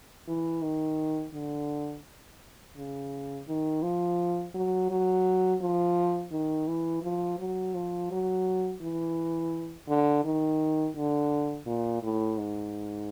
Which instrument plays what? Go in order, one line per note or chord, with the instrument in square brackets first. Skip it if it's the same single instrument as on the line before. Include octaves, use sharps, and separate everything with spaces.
[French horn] E3
D#3
D3
C#3
D#3
F3
F#3
F#3
F3
D#3
E3
F3
F#3
F3
F#3
E3
D3
D#3
D3
A#2
A2
G#2